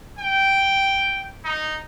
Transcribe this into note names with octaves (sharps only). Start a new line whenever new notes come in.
G5
D#4